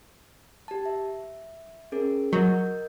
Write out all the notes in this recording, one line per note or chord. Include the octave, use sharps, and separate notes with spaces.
G4 A5
E5
C#4 G#4 A#4
F#3 A#4 D#5 G6